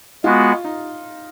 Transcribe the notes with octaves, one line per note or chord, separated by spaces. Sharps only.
G#3 B3 F4 F#4
D#4